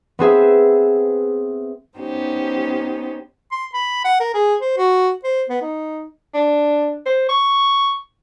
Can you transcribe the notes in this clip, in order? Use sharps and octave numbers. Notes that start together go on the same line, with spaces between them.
B3 C4 G#4 E5
B3 C#4 D#4 G4 C5
C6
B5
F#5
A#4
G#4
C5
F#4
C5
B3
D#4
D4
C5
C#6